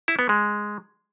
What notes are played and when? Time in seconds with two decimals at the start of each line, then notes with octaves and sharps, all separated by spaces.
0.08 E4
0.19 B3
0.29 G#3